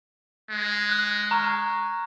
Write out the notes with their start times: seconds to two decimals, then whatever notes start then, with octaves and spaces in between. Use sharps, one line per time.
0.50 G#3
0.89 F#6
1.31 A#5 C#6 F6